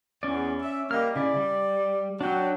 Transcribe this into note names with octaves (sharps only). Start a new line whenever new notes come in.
E2 C#4 D5
E5
G3 A#3 D#5 F6
C#3 E4 D5
G3
F#3 D4 G5